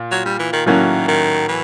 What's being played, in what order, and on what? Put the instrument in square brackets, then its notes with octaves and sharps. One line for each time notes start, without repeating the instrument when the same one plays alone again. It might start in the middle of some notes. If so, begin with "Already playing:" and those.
Already playing: [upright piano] A#2
[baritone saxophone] F#3
G3
E3
D#3
[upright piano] A2 F#3 A#3 C#4 F#4 [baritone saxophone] D#3
[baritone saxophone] D#3
E3